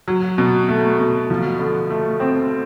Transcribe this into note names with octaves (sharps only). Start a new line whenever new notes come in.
F#3
B2
A3
B2
F3
D3
A3
C4